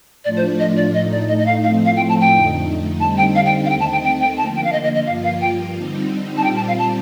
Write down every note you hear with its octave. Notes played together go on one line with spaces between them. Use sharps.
A2 F3 A3 D4 F4 D5
C5
D#5
D5
A2 A3 D#4 D#5
D5
D#5
D#5
F5
A2 F3 A3 C4 F5
F5
G5
A5
G5
F2 D3 A3 D#4
D3 G3 C4 D#4 A5
G5
F5
G5
F5
D#2 D#3 A3 C4 D#4 G5
A5
G5
G5
G5
D3 F3 A#3 A5
G5
F5
D#5
D#5
D#5
G2 F3 A#3 F4 F5
F5
G5
D3 G3 C4 D#4
A5
A#2 G3 C4 F4 G5
A5
F5
A5